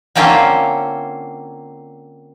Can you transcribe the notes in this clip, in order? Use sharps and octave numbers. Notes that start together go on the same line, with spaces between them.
D3 A#3 C4 C#4 F4 C5